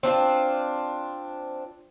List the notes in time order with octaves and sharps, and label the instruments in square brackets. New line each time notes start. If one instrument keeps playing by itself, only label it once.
[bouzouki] C4 D4 E4 F4